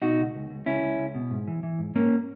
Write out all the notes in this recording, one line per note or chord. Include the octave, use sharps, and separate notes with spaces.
B2 D#4 F#4
C#2
C#2
C#2
C#2 C#4 E4
C#2
C#2
B2
G#2
E3
E3
G#2
G#2 A#3 C#4